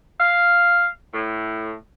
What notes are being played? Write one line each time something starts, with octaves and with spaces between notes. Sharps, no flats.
F5
A2